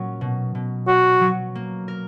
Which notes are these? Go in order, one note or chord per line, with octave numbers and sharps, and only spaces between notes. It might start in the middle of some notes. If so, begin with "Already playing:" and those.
Already playing: A#2 F#3 C#4
B2
B2
C#4 F#4
F#3
A#3
A#4